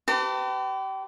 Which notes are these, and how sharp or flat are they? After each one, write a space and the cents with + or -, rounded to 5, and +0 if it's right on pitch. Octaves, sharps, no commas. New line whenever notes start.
G4 -30 B4 +40 A5 +40